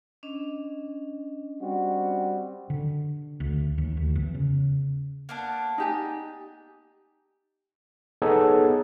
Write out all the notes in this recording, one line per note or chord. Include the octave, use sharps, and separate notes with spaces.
C#4 D4 D#5
G3 C4 F#4
D3
D2
D#2
D2
E2
C#3
A#3 B3 D4
D#4 G4 G#5
B3 D#4 G#4 A4 C#5